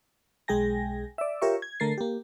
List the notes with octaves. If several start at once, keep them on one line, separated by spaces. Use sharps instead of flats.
B1 G#3 G#4 G5 G#5 A#6
D5 E5
F4 G4 A#4 C#5 E5 C#6
G#6
D3 A3 A#4 A6 C7
A#3 G4